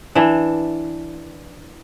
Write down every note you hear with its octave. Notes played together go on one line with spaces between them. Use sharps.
E3 D4